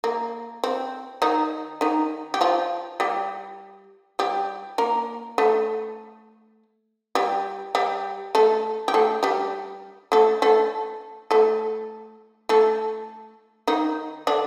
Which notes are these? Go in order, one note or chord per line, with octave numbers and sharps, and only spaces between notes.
A#3
C4
D#3 D#4
D#3 D#4
G4
F3 F4
G3 G4
G3 G4
A#3 A#4
A3 A4
G3 G4
G3 G4
A3 A4
G4
A3 A4
G3 G4
A3 A4
A3 A4
A3 A4
A3 A4
D#3 D#4
D3 D4